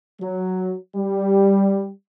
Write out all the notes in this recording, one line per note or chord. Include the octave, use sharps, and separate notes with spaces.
F#3
G3